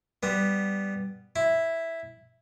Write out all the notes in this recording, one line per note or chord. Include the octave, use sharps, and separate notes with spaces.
G3 B3
E4